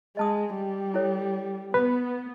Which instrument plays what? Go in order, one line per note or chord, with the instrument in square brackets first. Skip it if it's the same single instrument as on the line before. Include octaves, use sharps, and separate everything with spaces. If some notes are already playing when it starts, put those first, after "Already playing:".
[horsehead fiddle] G#3 [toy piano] D#5 A5 D#6
[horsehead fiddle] G3
[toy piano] E4 A4 C#5
[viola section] B3 [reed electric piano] B4 [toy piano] B5